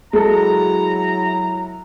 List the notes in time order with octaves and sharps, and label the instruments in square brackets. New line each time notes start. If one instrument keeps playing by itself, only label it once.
[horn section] F#3 E4 A#5 [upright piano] G#3 A4